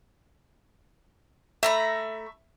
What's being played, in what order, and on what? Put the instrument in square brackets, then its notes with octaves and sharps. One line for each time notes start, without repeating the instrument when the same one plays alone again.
[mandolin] A3 A#5 B5 [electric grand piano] E5